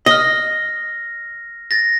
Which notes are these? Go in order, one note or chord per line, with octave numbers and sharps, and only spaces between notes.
D#5 F6 A#6
A6 A#6